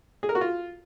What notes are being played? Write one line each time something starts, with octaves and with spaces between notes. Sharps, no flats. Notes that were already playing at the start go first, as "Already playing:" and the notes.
G#4
A#4
F#4
F4